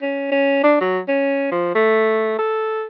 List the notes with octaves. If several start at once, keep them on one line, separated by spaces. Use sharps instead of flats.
C#4
C#4
D4
F#3
C#4
F3
A3
A4